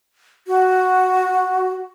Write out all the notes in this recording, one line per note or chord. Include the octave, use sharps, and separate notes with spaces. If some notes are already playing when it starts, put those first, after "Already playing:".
F#4